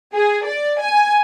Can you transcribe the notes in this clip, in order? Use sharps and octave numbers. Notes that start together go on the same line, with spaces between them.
G#4
D5
G#5